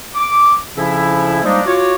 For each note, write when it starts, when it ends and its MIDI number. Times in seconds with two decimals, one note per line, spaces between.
0.15 0.55 86
0.76 1.41 41
0.76 1.41 49
0.76 1.41 53
0.76 1.41 61
0.76 1.41 64
1.43 1.60 53
1.43 1.60 55
1.43 1.60 56
1.43 1.60 58
1.43 1.60 62
1.43 1.60 63
1.65 1.94 65
1.65 1.94 66
1.65 1.94 73
1.65 1.94 86